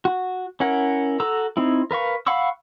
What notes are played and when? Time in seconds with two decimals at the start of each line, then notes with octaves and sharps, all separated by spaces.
0.05 F#4
0.60 C#4 E4 A#4 F#5
1.20 F#4 A4 A#5 E6
1.57 C4 D#4 E4
1.91 A#4 B4 F5 C#6
2.27 F5 F#5 B5 C#6 E6